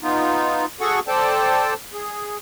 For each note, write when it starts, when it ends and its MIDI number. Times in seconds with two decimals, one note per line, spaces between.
0.01 0.65 59
0.01 0.65 63
0.01 0.65 65
0.81 1.00 66
0.81 1.00 68
0.81 1.00 69
0.81 1.00 78
0.81 1.00 85
1.08 1.74 69
1.08 1.74 72
1.08 1.74 74
1.08 1.74 79
1.08 1.74 81
1.94 2.38 68